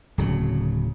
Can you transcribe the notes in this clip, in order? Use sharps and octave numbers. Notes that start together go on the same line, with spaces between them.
D1 C#3 F#3